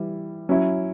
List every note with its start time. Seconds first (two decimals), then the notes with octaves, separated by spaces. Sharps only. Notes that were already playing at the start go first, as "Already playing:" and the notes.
Already playing: E3 G3 E4
0.49 F#3 C#4 E4